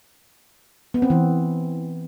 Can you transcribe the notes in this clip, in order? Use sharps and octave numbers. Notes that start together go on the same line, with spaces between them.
B3
C4
E3